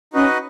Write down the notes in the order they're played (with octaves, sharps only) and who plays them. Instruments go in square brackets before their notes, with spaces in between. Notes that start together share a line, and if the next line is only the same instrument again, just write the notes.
[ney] C#4 [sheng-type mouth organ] D#4 F#4 B4 D#5 F#5